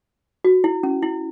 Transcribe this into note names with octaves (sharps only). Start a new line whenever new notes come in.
F#4
E4
C#4
E4